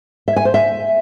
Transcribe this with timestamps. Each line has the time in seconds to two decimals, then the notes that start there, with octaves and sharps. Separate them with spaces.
0.28 E5
0.36 G#5
0.45 C5
0.54 E5